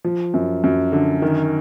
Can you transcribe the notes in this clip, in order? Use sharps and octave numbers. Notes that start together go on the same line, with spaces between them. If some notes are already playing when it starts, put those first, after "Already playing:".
F3
F#2
F#2
D3
D#3